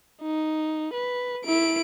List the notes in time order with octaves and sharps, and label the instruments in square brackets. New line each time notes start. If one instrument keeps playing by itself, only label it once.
[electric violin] D#4
B4
E4 D7